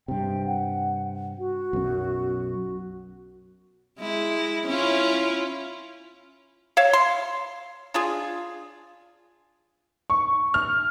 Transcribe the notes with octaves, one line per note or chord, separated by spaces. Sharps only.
G2 C3 G5
F#5
F#4
B1 F#2
G#3 E4
C#4 E4 F4
C#5 E5 F5
C6
D4 F4 G#4
C#6
F6